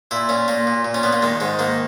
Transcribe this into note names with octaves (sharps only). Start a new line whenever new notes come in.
A#2 E4
A#2 C#4
A#2 A#3
A#2
A#2
C#4
A#2 B3
A#3
D#3 G#3
G#2 G#3
D#3 A#3